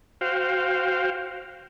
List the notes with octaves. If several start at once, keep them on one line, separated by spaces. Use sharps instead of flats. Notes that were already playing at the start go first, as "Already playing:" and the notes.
F#4 C5 F5 G5